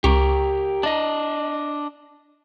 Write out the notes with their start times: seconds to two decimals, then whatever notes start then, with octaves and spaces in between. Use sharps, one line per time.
0.04 C#2 G4 A#4 C#6 D6
0.83 D4 D#5 A5 A#5